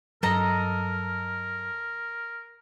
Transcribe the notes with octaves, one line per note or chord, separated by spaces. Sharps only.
G2 F#3 A4 A#4 D#5 A#5